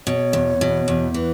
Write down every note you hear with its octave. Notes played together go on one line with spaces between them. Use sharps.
B2 C#5
E2
B2
E2
E3 B4